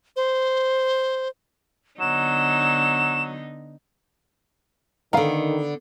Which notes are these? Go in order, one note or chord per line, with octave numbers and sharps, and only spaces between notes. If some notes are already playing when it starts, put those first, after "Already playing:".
C5
D3 F#3 B3 D#4 E7
D3 D#3 B3 F5 F#5 A#5